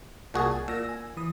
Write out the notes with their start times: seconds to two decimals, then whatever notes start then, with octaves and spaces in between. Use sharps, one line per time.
0.34 C2 A#2 F#4 G#4 A5
0.51 G#5
0.68 A#2 E6 A#6
0.89 G#5
1.17 E3 D#6